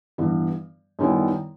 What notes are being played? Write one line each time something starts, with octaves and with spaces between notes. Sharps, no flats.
G2 E3 B3
F#2 D#3 G3 B3 E4